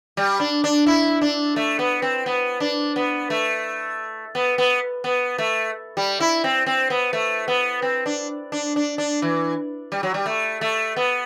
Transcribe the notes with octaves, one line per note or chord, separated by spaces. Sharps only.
G3
D4
D4
E4
D4
A3
B3
C4
B3
D4
B3
A3
B3
B3
B3
A3
G3
E4
C4
C4
B3
A3
B3
C4
D4
D4
D4
D4
E3
G3
F#3
G3
A3
A3
B3